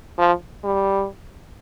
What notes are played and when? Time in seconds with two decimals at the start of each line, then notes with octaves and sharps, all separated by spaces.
0.18 F3
0.64 G3